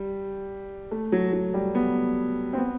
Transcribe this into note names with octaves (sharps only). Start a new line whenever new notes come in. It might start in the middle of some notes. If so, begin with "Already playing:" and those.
Already playing: G3
A3
F#3
F#3
G3
B3
C4
B3